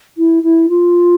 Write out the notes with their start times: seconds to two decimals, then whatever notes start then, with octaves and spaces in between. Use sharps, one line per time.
0.17 E4
0.43 E4
0.69 F4